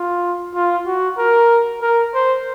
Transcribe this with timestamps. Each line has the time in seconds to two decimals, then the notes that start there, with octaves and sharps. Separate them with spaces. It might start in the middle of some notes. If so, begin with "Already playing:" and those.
Already playing: F4
0.54 F4
0.86 F#4
1.17 A#4
1.81 A#4
2.14 C5